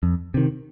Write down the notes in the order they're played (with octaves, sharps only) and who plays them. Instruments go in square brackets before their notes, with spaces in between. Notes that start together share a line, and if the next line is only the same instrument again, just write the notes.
[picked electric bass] F2
C3 D#3